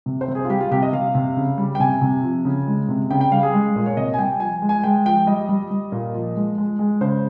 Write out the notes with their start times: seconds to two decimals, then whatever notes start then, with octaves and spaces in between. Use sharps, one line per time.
0.06 C3
0.21 C5
0.28 C3
0.35 G#4
0.45 F4
0.49 G3 G4
0.61 F4
0.71 C3 G4
0.82 D#5
0.93 C3 F5
1.15 C3
1.37 C#3
1.57 G3
1.75 G5
1.80 C3 G#5
2.02 C3
2.23 F3
2.45 C#3
2.67 G#3
2.89 C3
3.10 C#3 G5
3.21 G5
3.32 G3 F5
3.43 G#4
3.53 G#3
3.76 A#2
3.86 C#5
3.97 C3 D#5
4.14 G#5
4.18 G3 G5
4.40 F3 G#5
4.62 G#3
4.69 G#5
4.83 G#3 G5
5.06 F3 G5
5.27 G3 D#5
5.49 G3
5.71 G3
5.92 A#2
6.14 F3
6.36 G#3
6.58 G#3
6.79 G#3
7.01 C#3 C5